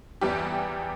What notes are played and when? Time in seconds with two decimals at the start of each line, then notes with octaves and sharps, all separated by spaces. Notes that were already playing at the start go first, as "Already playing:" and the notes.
0.21 E2 E3 G3 G4